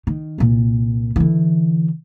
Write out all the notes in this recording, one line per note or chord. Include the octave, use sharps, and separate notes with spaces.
D#3
C2 A#2
D3 E3